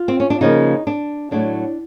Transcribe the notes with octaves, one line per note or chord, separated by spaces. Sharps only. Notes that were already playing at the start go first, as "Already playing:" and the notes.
Already playing: F4
C4
C#4
D4
C#3 F3 A#3 D#4
D4
A2 F#3 A3 D4